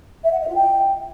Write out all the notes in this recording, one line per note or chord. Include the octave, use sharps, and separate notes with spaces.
E5
F#5
D#5
F4
G5